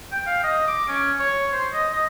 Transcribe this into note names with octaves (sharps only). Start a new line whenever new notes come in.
G5
F5
D#5
D6
C#4
C#5
C5
D#5
D#5